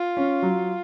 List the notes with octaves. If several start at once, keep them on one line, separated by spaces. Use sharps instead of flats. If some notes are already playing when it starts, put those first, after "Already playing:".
Already playing: F4
C#4
F#3